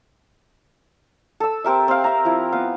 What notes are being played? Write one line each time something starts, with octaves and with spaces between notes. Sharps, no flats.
A4 E6
C4 G4 A#4 E5
C4 F5
E5 A#5
F3 E4
B3 F5